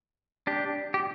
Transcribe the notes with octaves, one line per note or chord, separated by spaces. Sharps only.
D4 G4
G4